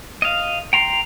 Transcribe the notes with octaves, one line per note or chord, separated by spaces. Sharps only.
D#5 F5
G5 A#5 C6